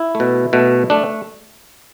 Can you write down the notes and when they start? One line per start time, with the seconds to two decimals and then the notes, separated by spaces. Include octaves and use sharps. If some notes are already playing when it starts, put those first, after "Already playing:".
Already playing: E4
0.15 A3
0.20 B2
0.53 B2 A3
0.90 A3 D4